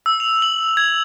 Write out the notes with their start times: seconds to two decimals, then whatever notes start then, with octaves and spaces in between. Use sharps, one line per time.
0.06 E6
0.20 F7
0.42 F#7
0.77 G#6